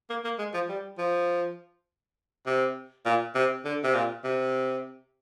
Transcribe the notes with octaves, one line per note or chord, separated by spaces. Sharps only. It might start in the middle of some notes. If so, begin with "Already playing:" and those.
A#3
A#3
G#3
F3
G3
F3
C3
A#2
C3
D3
C3
A#2
C3